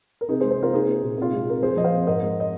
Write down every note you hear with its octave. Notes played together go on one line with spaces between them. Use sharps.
A#4
C3 D#4 G#4
G#4 C5
G#3
G#4 C5
C3 F4 A#4
A#3 D#4 G#4
A#3
A#2
C3 F4
G#3 G#4
C3 A#4
F2 G#4 C5
F3 D#5
C5 F5
F2
G#2 A#4 D#5
G#3
D#5